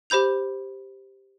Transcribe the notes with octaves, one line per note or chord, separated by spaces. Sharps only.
G4 C5 B5 G6 F7